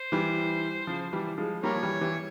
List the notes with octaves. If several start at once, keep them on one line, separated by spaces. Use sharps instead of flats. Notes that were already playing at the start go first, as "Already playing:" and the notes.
Already playing: C5
E3 G3
C#3 F3
E3 G3
F3 G#3
G3 A#3 A#4 C#5
F3
E3 G3
E3 G3